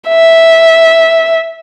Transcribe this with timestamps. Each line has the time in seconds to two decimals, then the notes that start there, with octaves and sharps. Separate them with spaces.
0.09 E5